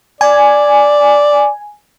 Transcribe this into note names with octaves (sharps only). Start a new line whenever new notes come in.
D5 G#5